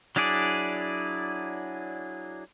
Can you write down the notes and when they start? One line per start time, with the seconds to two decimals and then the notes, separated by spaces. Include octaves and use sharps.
0.16 F#3 D4 E4 G#4 D5